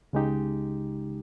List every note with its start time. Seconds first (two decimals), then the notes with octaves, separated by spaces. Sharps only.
0.13 C#2 C#3 G#3 D#4 G4